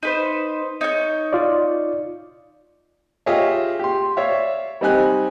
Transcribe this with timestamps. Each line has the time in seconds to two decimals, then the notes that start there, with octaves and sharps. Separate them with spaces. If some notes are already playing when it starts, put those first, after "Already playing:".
0.03 D#4 B4 C5
0.81 D#4 C#5 G6
1.33 F4 D5
3.26 F4 G4 G#4 C#5 D#5 E5
3.79 G4 C6
4.17 C#5 D5 E5 F5
4.81 G3 C4 D#4 G4 G#5 F#6